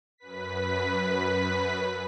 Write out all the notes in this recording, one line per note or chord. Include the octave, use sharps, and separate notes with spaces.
F#2 B4 B6